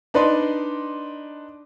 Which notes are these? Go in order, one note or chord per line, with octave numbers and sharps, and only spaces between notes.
D4 D#4 B4 D5 D#5 C6